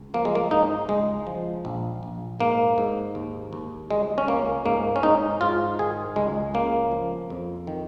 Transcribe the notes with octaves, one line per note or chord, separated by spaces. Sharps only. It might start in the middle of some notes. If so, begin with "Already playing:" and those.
Already playing: C#2
F3 A#3
G#3
A#3
G#2 D#4
C#2 G#3
F3
A#1
A#1
G#2 A#3
G#2
D#2
D#2
C#2 G#3
C#4
C#2 A#3
G#2 A#3
C#4
G#2 D#4
G#2 F4
D#3 G#4
C#2 G#3
C#3 A#3
F3
F2
D#3